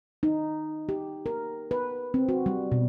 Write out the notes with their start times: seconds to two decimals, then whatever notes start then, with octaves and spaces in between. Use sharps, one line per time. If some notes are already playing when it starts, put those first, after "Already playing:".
0.23 D#4
0.89 G4
1.26 A#4
1.71 B4
2.14 C4
2.29 F#4
2.46 G3
2.72 B2